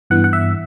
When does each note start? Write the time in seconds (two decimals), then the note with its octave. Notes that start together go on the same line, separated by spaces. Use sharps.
0.10 G2 E3 B3 F#5
0.24 F#5
0.33 E5